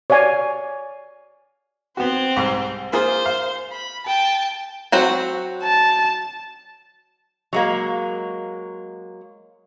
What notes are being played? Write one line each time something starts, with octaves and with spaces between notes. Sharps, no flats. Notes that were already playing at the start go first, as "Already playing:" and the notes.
C#5 D5 F5 G#5
B3 C4 F#4 C5
C2 G#2
A#3 F4 G#4 C5
F5
B5
G5 A5
F#3 C4 F#4
A5
F#3 G#3 A#3